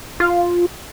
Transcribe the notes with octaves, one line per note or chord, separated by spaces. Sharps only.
F4